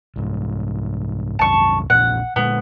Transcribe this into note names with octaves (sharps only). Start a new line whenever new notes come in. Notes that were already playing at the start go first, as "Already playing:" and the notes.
C2 G#2
C2 F#2 A5 C#6
A#1 E2 A#2 F#5
A#2 D3 G#3 B3